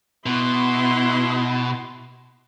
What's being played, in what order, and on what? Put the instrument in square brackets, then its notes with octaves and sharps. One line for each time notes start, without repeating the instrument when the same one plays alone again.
[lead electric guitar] B2 [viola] E4 C6